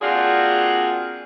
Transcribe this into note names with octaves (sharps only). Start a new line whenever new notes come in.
A#3 C4 D4 F4 F#4 G#4